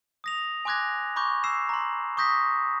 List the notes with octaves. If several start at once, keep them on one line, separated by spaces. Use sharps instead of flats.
D#6 A#6 F7
G#5 C6 D6 F#6 G#6 A#6
B5 C#6 D6 G6
E6 C7 E7
A#5 C6
C#6 D#6 G6 A#6 B6